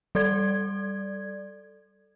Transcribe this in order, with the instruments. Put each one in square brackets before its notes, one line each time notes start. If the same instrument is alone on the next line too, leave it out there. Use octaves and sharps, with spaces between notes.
[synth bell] G3 A4 D5 G#6